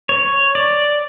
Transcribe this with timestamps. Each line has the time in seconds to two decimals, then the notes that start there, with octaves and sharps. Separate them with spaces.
0.09 C#5
0.55 D5